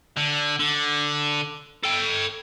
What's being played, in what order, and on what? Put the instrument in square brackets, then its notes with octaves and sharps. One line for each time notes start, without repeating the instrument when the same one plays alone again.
[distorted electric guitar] D3
D3
A4 G5